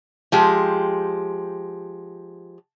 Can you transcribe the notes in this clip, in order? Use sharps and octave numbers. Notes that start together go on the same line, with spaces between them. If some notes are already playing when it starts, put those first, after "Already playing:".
F3 G#3 G4